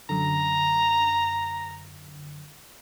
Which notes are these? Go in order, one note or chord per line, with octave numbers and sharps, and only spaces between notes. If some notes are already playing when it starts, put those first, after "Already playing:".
F#2 D3 A#5